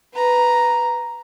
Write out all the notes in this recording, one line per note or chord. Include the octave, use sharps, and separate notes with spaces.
B4 A#5